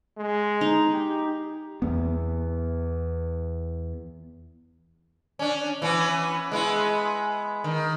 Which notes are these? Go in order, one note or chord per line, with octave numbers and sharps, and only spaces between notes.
G#3
D#4
G4
E2 B3
C#4 D4
E3 B3 C#4
G#3 B3 E4
D#3